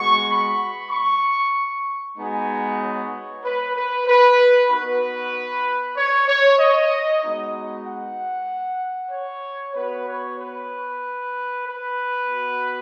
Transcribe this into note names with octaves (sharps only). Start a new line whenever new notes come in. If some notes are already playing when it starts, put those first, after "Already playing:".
Already playing: G#3 B3 F#4 C#6
B5
C#6
G#3 B3 D#4 F#4 G#5
C#5
B4
B4
B4
B3 D#4 F#4 B4
C#5
C#5
D#5
G#3 B3 D#4 F#4
F#5
C#5
B3 F#4 B4
C#5
B4
B4
B3 F#4